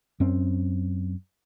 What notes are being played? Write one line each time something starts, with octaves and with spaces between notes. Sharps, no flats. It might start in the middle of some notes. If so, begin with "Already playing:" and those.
F#2 C4 C#4